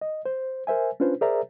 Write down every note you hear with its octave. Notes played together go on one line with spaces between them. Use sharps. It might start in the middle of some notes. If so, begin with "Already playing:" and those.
D#5
C5
A#4 C5 E5 G#5
C#4 D4 F4 B4 C5
G#4 A#4 C5 D5 E5 A#5